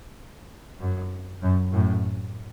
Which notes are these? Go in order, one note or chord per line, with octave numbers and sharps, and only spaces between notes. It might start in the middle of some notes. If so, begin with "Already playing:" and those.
F#2
F#2
F#2 A2